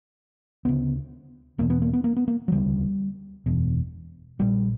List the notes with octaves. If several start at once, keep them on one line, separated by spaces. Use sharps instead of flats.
D2 C#3 B3
E1 E2 B2 A#3
B3
A#3
B3
A#3
B3
A#3
F#3
E1 D2 C#3 G3
F#1 E2 B2
A#1 A#2 G3